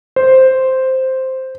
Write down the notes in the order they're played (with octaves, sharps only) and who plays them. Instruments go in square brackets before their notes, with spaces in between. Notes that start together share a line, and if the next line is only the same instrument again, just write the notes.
[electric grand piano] C5